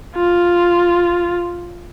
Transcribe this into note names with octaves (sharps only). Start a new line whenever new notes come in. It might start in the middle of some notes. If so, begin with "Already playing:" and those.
F4